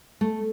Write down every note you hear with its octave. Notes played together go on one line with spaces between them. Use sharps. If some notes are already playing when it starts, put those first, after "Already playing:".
A3